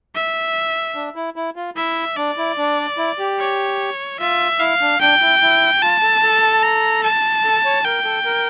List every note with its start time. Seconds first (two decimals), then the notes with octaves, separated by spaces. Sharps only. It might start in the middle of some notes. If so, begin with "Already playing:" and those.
0.15 E5
0.95 D4
1.16 E4
1.36 E4
1.56 F4
1.76 E4 E5
2.17 D4 D5
2.38 E4
2.58 D4
2.98 E4
3.19 G4
3.39 C#5
4.20 F4 E5
4.60 E4 F5
4.81 D4
5.01 D4 G5
5.21 E4
5.42 E4
5.82 F4 A5
6.03 A4
6.23 A4
6.63 A#5
7.03 A5
7.44 A4
7.65 C#5
7.85 A#4 G5
8.05 A4
8.25 A#4